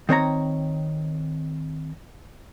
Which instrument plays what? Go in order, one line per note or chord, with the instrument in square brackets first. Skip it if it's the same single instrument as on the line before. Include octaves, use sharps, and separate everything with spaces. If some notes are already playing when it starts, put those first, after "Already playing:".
[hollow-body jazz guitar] D#3 C4 C#5 A#5